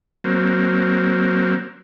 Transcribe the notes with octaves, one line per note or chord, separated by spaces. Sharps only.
F#3 A#3 C4